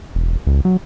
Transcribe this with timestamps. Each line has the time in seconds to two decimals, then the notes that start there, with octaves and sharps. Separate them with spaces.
0.15 E1
0.47 C#2
0.65 F#3